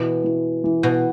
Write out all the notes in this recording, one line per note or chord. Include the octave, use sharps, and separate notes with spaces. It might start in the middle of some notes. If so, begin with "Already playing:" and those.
Already playing: B2 E3
E3
E3
B2